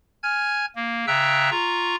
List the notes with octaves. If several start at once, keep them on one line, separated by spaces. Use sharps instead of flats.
G#5 F6 G#6
A#3
C#3 E5 G5 A#5 E6 F#6
F4 A#5 C#6